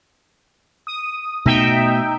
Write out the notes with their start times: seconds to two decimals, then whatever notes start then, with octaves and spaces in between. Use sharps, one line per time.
0.87 D#6
1.46 B2 A3 D#4 E5 G5